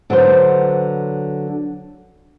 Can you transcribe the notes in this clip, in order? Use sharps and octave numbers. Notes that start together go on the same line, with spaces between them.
D3 F#3 B4 C5